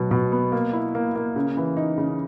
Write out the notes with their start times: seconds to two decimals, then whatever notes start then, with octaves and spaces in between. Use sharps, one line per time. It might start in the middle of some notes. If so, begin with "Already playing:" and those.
Already playing: B2 F#3
0.11 B2
0.32 B3
0.52 A#3
0.73 E4
0.95 A#3
1.16 A#3
1.36 C#3
1.57 E3
1.77 D#4
1.98 C#3